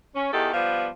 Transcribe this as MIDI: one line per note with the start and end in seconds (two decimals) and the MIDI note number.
0.15 0.27 61
0.31 0.49 40
0.31 0.49 51
0.31 0.49 67
0.31 0.49 69
0.53 0.88 53
0.53 0.88 55
0.53 0.88 59